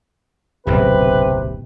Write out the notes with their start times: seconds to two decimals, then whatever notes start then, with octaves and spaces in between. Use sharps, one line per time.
0.67 D1 B1 F#2 C3 B4